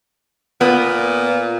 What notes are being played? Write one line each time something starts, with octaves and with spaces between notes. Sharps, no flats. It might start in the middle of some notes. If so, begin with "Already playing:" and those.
A#2 B3